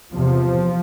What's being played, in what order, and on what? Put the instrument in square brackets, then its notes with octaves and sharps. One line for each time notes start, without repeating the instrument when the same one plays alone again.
[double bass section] E2 C3 F3